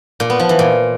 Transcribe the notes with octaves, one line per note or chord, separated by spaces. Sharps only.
A#2
B3
F3
E3
A#2